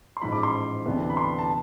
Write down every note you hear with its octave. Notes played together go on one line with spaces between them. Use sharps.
C6
A1 G#2 F3 B5
D6
C6
D2 C3 E3 B3 D4
B5
C6
A5